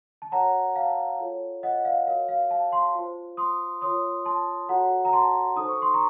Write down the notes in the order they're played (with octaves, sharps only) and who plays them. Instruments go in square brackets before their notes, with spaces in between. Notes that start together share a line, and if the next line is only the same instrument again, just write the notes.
[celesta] A5
F#4 A#4 C#5 F#5 A#5
F5 A5
F4 A4 C#5
D#5 F#5
F5
F#4 A#4 C#5 F5
F5
F5 A5
A5 C6
F4 C5
C6 D#6
F4 A#4 C#5 C6 D#6
A5 C6
F#4 A4 C#5 F#5 A#5
A#5
A5 C6
D#4 A4 C5 D#6
C#6
C6
A#5 C#6